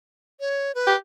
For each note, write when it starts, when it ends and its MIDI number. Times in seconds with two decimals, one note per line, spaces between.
0.40 0.72 73
0.75 0.95 71
0.87 0.96 67